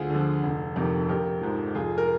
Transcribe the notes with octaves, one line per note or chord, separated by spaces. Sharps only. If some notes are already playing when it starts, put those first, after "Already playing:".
Already playing: D2 F4 G#4
D3
F3
F1
F2 C3 D#3
A#1 G4 A#4
G#2 F3
F1 F4 G#4
A#4